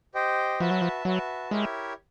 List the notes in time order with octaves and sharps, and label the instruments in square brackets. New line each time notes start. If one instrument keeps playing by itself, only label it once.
[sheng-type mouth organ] G4 C5 D#5 G5
[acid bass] F3 [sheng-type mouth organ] F#4 B4 E5 A5
[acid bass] F#3
F3
[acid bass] F#3 [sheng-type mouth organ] F#4 B4 E5 A5
[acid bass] G#3 [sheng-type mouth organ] E4 G4 A#4 C#5 E5